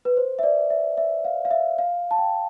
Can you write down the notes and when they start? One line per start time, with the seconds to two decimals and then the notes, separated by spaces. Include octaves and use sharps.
0.05 B4
0.17 C5
0.39 E5
0.43 D5
0.70 E5
0.97 E5
1.25 F5
1.45 F5
1.51 E5
1.78 F5
2.11 A5
2.18 G5